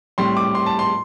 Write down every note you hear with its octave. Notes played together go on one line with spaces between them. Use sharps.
A2 G3 C4 C6
D6
C6
A5
C6